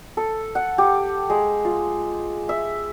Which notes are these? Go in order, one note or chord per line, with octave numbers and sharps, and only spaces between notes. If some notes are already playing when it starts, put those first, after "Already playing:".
A4
F#5
G4
G#3
F4
E5